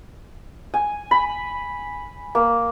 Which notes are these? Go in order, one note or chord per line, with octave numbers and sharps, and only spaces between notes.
G#5
B5
A#3